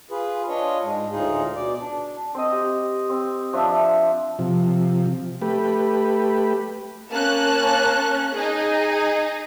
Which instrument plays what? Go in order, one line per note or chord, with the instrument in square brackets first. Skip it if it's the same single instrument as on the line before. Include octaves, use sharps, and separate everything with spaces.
[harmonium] F4 G#4 B4
D4 F4 C#5 D#5
G#2 G#3
D2 A2 D#4 F4 G#4
B2 D5
D4
[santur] C4 D#5
G4
C4
F3 D4 E5
[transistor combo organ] C3 F3
A3 G4 B4
[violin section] A#3 C#4 A5 F#6
D#4 G#4